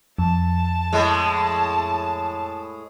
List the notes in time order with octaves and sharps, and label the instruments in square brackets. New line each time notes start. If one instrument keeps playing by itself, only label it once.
[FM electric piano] F2 [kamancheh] A5
[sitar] A2 G#3